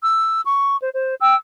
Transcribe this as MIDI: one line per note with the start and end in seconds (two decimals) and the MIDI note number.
0.03 0.41 88
0.46 0.78 85
0.80 0.89 72
0.94 1.15 72
1.20 1.34 79
1.20 1.34 88